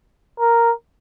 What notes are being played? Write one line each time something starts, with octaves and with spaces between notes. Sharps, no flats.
A#4